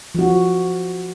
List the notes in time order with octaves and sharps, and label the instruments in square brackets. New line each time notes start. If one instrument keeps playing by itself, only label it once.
[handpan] F3 F#4